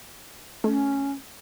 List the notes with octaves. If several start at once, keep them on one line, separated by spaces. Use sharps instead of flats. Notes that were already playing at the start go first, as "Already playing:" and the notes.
A3 C#4